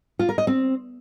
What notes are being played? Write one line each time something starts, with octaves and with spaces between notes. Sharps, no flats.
F4
A#4
D#5
C4